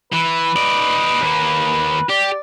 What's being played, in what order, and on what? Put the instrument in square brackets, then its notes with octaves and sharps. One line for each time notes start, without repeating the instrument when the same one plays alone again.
[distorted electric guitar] E3 [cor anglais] B4
[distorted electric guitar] D#4 D5
D#2 A#3
[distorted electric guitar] G4 [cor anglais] D5